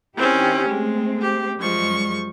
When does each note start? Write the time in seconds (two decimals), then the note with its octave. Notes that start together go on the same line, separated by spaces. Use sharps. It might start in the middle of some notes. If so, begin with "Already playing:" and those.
0.17 D#3 C4 C#4 E4 G4
0.69 G#3 A3 C4
1.22 G4
1.60 F#2 F3 G3 G#3 C#6